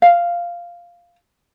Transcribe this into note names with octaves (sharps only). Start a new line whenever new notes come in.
F5